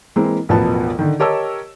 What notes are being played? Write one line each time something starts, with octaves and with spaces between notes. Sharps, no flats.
E3 G#3 A#3 C4
E1 A1 B2 F3 B3 A5
D3 D#3
G4 A#4 C#5 D#5 A5 E6